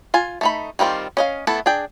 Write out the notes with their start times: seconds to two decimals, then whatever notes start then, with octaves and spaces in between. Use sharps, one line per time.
0.14 F4 G#5
0.41 A3 D#4 B5
0.79 D#3 G3 B3 C4 F4
1.17 C#4 D#5 F5
1.47 A3 B3 E4 A4
1.66 D4 G#4 G5